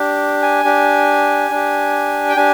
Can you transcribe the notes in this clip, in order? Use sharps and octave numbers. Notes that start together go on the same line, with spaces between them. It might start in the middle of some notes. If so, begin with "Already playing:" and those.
Already playing: D4 G4
G#5
D4 G4
D4 G4
G5
D4 G4 G#5